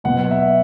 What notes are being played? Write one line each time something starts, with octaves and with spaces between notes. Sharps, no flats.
B2 F#3 B3 F#5
E5